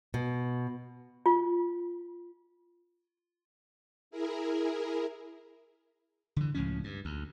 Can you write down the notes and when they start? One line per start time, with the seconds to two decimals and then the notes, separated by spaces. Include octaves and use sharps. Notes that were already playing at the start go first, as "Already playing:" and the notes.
0.14 B2
1.26 F4
4.11 E4 G#4 A#4
6.36 D3 E3
6.55 C#2 A2 F3 C#4
6.84 G2
7.05 D2